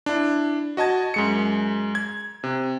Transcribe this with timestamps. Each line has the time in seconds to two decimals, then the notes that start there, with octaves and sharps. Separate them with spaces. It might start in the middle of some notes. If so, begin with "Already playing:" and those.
0.06 D4 E4
0.77 F#4 D#5 A5 G#6
1.14 F#2 G#3 C#7
1.95 G#6
2.44 C3